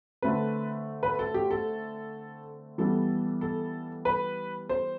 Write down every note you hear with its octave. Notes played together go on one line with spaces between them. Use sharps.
D3 A3 C4 B4
B4
A4
G4
A4
E3 G3 B3 A4
A4
B4
C5